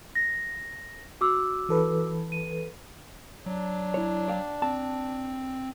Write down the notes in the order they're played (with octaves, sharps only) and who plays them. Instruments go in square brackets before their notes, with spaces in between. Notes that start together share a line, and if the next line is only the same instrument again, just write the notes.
[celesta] A#6
F#4 D6 E6
[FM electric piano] E3 A4 B4
[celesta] D#7
[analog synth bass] F#3 [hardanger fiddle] D4
[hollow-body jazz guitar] E4 C#5
D5 F5 G5
[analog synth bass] C4 [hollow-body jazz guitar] A5